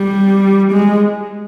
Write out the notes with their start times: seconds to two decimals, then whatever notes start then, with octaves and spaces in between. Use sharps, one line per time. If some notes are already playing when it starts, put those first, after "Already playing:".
Already playing: G3
0.72 G#3